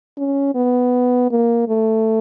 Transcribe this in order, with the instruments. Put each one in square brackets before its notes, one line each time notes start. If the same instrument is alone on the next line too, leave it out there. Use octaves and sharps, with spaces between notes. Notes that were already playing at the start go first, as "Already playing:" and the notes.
[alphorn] C#4
B3
A#3
A3